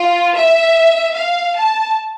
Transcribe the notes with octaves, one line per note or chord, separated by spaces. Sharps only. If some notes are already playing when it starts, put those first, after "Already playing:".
Already playing: F4
E5
F5
A5